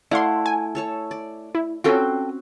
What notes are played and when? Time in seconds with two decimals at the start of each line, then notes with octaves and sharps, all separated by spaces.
0.11 A3 E4 D5 F5 F#5 C6
0.46 G#5
0.75 A4 C#5 A5
1.11 D5
1.55 E4
1.84 C4 C#4 F4 F#4 A4 G5